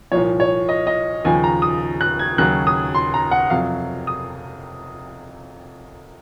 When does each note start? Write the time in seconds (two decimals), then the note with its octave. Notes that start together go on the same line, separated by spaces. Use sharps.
0.12 C2 A#2 F3 C#5
0.40 C#5
0.69 D#5
0.87 D#5
1.25 D#2 C#3 F3 G#5
1.44 A#5
1.62 D#6
2.01 F#6
2.19 G#6
2.38 D#2 C#3 F#3 F#6
2.67 D#6
2.95 C6
3.14 A#5
3.31 F#5
3.50 F2 C3 F#3 F5
4.07 D#6